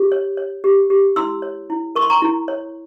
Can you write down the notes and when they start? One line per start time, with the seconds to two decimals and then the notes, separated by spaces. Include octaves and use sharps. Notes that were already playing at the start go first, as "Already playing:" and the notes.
Already playing: G4
0.12 C#5
0.37 C#5
0.64 G4
0.90 G4
1.16 E4 C6 E6
1.42 C#5
1.70 E4
1.95 A#4 C#6
2.02 C6
2.10 A#5 C#6
2.22 E4
2.48 C#5